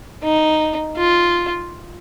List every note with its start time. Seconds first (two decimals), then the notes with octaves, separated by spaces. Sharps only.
0.23 D#4
0.96 F4